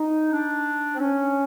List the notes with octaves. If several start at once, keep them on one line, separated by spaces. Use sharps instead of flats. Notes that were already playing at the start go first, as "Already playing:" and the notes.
Already playing: D#4
D4
C4
C#4